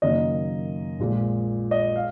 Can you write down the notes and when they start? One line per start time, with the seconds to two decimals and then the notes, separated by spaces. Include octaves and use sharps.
0.02 F#1 F#2 D#3 A#3 D#5
0.99 A#1 A#2 G#3
1.71 D#5
1.96 F5